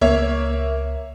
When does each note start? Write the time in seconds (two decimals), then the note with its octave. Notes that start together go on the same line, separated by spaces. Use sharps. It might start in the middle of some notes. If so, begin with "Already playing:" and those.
0.01 C#2 A#3 C#5 E5